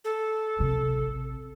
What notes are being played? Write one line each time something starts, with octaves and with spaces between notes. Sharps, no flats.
A4
A1 C3